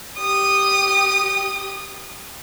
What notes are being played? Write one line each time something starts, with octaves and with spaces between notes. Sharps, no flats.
G4 D#6